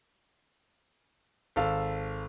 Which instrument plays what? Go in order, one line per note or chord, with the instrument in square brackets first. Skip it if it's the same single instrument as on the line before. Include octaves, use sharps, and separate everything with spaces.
[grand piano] G#1 A4 F5